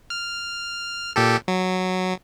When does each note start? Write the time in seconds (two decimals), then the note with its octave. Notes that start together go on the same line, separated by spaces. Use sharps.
0.10 F6
1.16 A#2 G4 A4
1.48 F#3